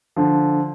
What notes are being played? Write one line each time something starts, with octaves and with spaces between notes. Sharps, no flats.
D3 F3